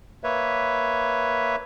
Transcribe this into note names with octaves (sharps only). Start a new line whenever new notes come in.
A#3 B4 C#5 E5